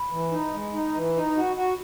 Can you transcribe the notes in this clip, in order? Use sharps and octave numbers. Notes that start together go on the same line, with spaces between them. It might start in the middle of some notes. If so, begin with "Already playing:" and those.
Already playing: B5
E3
D#4
G#3
D#4
E3
D#4
F#4
F#4